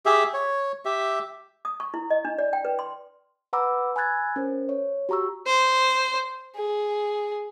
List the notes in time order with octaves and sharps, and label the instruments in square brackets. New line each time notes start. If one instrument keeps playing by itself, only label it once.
[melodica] G4 G#4 E5
C#5
G4 E5
[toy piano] D#6
C#6
E4
D#5
D4
D5
G5
B4
C6
[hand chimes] B4 F#5 A#5 B5 D6 E6
G#5 B5 E6 F#6 G#6 A6
C#4 A#4 C5
C#5
F#4 G4 A#5 C#6 E6
[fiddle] C5
G#4